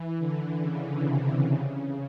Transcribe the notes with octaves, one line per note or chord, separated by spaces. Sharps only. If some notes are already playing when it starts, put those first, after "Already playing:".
Already playing: E3
D3
C#3
C3
C#3